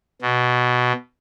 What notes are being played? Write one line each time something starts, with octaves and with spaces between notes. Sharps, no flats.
B2